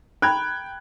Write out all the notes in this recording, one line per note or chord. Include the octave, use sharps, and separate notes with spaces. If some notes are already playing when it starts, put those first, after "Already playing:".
A4 G5 A#5 B5 F#6 G#6